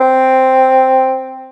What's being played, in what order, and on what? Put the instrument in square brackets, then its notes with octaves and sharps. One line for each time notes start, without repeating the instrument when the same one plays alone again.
[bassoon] C4